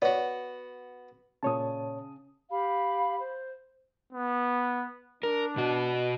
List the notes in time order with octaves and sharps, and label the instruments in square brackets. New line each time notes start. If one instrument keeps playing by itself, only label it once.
[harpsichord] B3 F#4 [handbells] C#5 D5
[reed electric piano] A#2 C#5 A5 [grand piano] C#3 D#6
[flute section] G4 F5 B5
C5
[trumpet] B3
[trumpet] D4 [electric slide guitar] A#4
[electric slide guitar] B2 F#4